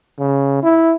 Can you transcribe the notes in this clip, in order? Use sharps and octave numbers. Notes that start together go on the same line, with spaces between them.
C#3
E4